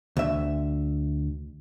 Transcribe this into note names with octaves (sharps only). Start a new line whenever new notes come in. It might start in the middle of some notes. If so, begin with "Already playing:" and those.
D2 E5